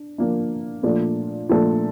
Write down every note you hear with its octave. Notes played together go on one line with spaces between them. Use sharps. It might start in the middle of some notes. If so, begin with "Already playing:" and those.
Already playing: D4
F3 A#3 D4
A#2 F3 A3 D4 A4
A#2 F3 A3 D4 A4